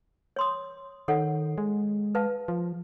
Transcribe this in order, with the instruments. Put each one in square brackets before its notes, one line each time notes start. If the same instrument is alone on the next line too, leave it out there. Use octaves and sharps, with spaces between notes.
[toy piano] C#5 C6 D#6
[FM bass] D#3 [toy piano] A4 C#5 F#5
[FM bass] G#3
[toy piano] B4 F5 A5
[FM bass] F3